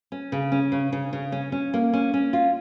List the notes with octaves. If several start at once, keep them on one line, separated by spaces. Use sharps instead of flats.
C#4
C#3
C#4
C#3
C#3
C#3
C#4
C#4
A#3
C#4
C#4
F4